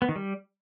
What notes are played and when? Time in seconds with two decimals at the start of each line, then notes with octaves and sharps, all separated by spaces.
0.02 B3
0.09 D#3
0.16 G3